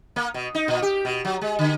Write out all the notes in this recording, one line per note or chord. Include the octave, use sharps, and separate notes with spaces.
A#3
B2
D#4
A#2
G4
B2
F#3
G#3
D3